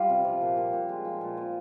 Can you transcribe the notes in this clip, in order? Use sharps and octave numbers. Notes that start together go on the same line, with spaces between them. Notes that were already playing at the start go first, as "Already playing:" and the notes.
Already playing: G3 F4 G4
C3
F3
A#2
A#2
A#2
G#3
F3
A#2
F3